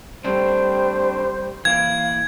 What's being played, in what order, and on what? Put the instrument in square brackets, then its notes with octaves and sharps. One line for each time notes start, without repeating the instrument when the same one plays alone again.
[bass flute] G3 [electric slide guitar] A3 C4 D4 [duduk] C5
[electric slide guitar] E3 A#3 E4 [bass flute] F5 [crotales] G#6